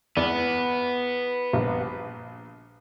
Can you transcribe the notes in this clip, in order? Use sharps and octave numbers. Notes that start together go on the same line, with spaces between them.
E2 B3 D5 D6
A#1 G3